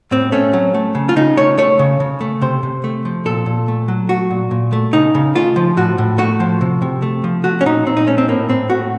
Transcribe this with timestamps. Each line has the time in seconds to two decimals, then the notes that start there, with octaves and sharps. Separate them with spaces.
0.11 A2 C4
0.32 A3 C#4
0.53 F#3
0.74 A3
0.95 C#3
1.09 F4
1.16 C#3 D#4
1.37 A3 C#5
1.58 A3 C#5
1.79 C#3
2.00 C#3
2.21 A3
2.41 C3 C5
2.63 C3
2.84 A3
3.05 F3
3.25 A#2 A4
3.46 A#2
3.68 A3
3.88 F#3
4.09 A3 F#4
4.30 A#2
4.51 A#2
4.73 A3
4.93 C#3 D#4
5.15 C#3
5.35 A3 F4
5.56 F3
5.77 A2 F#4
5.98 A2
6.18 A3 F#4
6.40 F3
6.61 C3
6.82 C3
7.02 A3
7.24 F3
7.44 A3 F#4
7.61 C#4
7.65 A#2 D#4
7.86 A#2 C4
7.97 D#4
8.07 A3 C#4
8.18 C4
8.28 A2 A#3
8.49 A2 C4
8.70 A3 F#4